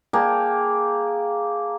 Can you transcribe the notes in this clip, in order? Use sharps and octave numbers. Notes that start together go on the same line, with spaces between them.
A#3 G#4 G5 A5